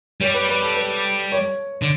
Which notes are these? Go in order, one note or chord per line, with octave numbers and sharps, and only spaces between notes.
G3 C#5
B4
B4
A4
B4
C#5
D3